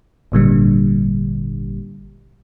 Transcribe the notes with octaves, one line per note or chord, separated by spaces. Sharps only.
G#1 A#2 D3 G3